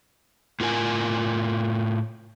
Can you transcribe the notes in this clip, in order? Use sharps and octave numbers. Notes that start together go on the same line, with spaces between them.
A2 F4 A#4 G#5